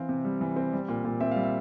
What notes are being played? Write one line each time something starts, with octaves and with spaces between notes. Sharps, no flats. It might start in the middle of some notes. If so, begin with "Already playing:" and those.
Already playing: E3 C4 F5
C3
G3
E3
C4
G3
A#2
A#2
C4 E5
G3 F5
E5